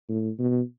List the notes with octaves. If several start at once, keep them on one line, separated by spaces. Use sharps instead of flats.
A2
B2